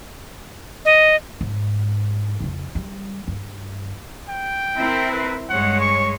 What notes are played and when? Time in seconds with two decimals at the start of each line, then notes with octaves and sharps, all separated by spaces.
0.85 D#5
1.41 G#2
2.40 F2 C#3
2.75 G3
3.28 G2
4.29 G5
4.75 C4 E4 A#4
5.11 B4
5.50 G2 G#3 C#5 F#5
5.81 C#6